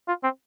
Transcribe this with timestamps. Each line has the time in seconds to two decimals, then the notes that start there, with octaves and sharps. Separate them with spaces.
0.08 F4
0.23 C4